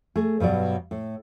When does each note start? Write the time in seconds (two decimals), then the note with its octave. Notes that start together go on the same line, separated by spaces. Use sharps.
0.16 A3 G#4
0.40 G2 B2 F#3 D5
0.91 A2